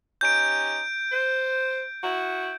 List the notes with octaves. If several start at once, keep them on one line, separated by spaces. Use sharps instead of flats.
C#4 D#4 G4 G6 D7
C5
E4 F#4